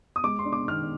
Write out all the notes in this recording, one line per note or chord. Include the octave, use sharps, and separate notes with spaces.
D#6
G#3 D6
C6
D4
D6
D#3 F6